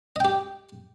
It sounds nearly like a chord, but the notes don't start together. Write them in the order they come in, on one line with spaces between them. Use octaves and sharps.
D#5 G5 G4